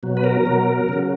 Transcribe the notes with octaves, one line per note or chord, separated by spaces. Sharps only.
B2 F#3
B4
A#4
B2 F#3
C#3 F#3